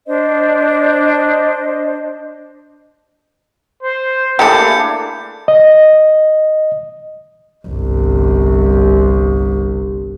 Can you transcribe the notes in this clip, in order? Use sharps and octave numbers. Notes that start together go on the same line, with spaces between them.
D4 C5 D#5
C5
A3 A#3 D4 E4 G4 G#4 G6 C#7
D#5
G1 C2